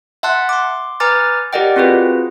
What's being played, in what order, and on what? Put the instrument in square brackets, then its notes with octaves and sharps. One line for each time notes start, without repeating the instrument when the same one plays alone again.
[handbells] E5 F#5 A5 C6 F#6
C6 D6
B4 G#5 A#5 D6 F6 A6
G4 A#4 D5 D#5 F#5 G5
C4 F4 F#4 G#4 B4